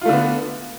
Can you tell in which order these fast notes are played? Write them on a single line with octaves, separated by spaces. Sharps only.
F4 A3 D3 B3